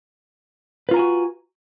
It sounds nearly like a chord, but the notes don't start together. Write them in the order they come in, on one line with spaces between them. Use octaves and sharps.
B4 F4 A#5 G#5 F#4